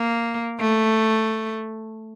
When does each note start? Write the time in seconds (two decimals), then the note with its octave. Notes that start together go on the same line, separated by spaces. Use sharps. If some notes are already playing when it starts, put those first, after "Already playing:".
Already playing: A#3
0.60 A3